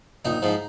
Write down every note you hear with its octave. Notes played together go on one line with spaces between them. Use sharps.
A#1 D#4
G#2 F3